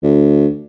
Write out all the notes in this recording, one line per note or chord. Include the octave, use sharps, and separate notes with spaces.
D2